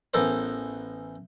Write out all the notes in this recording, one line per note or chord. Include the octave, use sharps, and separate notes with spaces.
A1 E3 B3 A4 A#4 C5